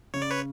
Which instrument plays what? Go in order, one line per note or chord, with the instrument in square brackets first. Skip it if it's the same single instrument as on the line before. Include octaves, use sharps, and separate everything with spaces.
[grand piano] C#3 [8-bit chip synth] C#5
[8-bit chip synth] D5
B4 C#5